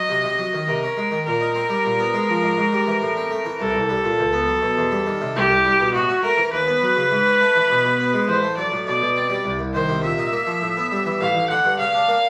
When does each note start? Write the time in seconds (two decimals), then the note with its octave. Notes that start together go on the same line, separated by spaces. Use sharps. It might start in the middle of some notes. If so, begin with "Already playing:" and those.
Already playing: F#3 D#5
0.09 C3
0.24 C3
0.39 F#3
0.53 D#3
0.68 C3 A#4
0.83 C#4
0.97 G#3
1.11 D#3
1.26 A#2 A#4
1.40 D#4
1.55 C4
1.69 G3
1.84 A#2
1.99 B3
2.14 G#3
2.29 F3
2.43 G#2
2.58 G#2
2.73 G3
2.87 E3
3.02 A2
3.17 C4
3.31 A3
3.45 E3
3.60 C2 A4
3.75 C2
3.89 G3
4.04 A#2
4.19 C#2
4.33 B3
4.48 F#3
4.62 B2
4.77 E2
4.91 G3
5.06 D#3
5.21 C3
5.36 C2 G4
5.50 C2
5.65 G3
5.80 B2
5.94 A2 F#4
6.09 C#4
6.23 A3 A#4
6.37 E3
6.52 D#2 B4
6.67 B3
6.82 F#3
6.96 C#3
7.11 G#2
7.26 C#4
7.41 A3
7.56 E3
7.70 B2
7.84 B2
7.99 B3
8.13 G#3
8.28 A1 C5
8.43 A3
8.57 F#3 D5
8.72 A2
8.86 B2 D5
9.01 B2
9.16 C4
9.30 G3
9.44 C2
9.59 C2
9.74 D#3 C5
9.89 C3
10.04 A#2 E5
10.18 D#4
10.32 A#3
10.47 F3
10.61 A2
10.77 B3
10.91 G3
11.05 E3
11.21 A1 F5
11.34 A1
11.50 D3 F#5
11.65 G2
11.79 C#3 F5
11.94 D4
12.08 A#3